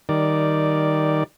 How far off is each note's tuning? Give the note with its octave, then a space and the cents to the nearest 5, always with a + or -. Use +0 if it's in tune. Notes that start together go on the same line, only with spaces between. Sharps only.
D#3 +0 G3 -15 D5 +0